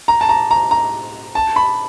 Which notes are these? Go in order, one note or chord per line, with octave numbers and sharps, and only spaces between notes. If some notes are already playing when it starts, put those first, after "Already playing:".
A#5
A5
A#5
A#5
A#5
A5
B5